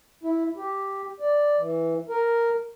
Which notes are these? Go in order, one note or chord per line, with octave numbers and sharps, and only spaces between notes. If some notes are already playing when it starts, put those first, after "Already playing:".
E4
G4
D5
E3
A#4